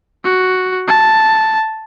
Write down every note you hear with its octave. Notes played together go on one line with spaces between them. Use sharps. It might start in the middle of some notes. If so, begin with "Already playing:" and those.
F#4
A5